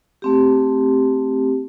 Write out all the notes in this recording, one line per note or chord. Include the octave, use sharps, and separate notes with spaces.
A3 C4 G4